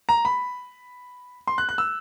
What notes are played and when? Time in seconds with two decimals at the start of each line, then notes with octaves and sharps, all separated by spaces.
0.09 A#5
0.25 B5
1.48 C6
1.58 F#6
1.69 F#6
1.78 E6